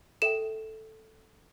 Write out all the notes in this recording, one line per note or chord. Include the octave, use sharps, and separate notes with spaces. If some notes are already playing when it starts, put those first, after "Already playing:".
A4 E5 G5 E7